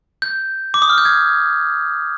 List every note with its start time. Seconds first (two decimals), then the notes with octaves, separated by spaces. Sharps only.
0.22 G6
0.74 D6
0.82 D#6
0.89 F6
0.98 G6
1.05 G#6